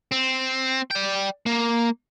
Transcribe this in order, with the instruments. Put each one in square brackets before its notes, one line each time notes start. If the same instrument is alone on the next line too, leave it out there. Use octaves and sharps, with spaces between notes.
[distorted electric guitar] C4
D5 G5
A#3